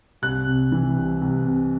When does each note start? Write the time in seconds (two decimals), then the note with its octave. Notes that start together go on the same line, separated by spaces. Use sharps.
0.22 C2 F#6
0.47 C3
0.72 E3
0.96 C2
1.21 C2
1.46 C3